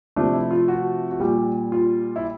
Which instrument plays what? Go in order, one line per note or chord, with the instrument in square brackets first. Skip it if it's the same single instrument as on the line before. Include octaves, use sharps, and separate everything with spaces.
[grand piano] C3 F3 A3 D4
E4
F4
F#4
F#4
A#2 G3 G4
F4
E4